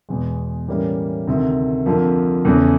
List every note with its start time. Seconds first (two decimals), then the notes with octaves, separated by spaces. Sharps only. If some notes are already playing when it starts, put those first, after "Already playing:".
0.09 E2 B2 G#3
0.67 A2 E3 G3 A#3 C#4
1.27 D2 C3 D#3
1.86 F2 D3 F3 A#3
2.45 E2 C#3 E3 A3